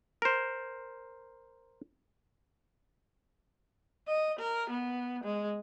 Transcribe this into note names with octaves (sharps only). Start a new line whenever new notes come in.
A#4 C5
D#5
A#4
B3
G#3